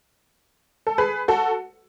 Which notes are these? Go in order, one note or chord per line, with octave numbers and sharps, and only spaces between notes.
A4
G#4 B4
F#4 A4